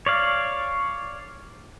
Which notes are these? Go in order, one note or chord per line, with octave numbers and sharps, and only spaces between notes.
C#5 D5 F5